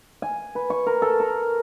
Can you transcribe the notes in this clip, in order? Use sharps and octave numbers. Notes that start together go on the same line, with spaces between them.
G#5
B4
C#6
A#4
A4
A#4